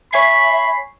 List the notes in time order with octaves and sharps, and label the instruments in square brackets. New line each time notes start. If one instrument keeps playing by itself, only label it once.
[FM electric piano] C#5 G#5 C7 [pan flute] E5 [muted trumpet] B5